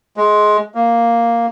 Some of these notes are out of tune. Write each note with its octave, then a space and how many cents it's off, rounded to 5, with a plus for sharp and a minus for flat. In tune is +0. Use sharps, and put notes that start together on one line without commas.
G#3 +20
A#3 +0